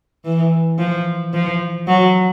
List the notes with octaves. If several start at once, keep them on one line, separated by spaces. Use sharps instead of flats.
E3
F3
F3
F#3